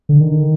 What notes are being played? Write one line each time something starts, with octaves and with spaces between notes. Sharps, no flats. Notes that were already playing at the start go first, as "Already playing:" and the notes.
D3
D#3